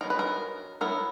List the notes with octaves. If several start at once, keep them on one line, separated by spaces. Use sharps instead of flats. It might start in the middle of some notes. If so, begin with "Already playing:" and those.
F#3 B3 D#4 A#4
B4
A#4
F#3 B3 E4 A#4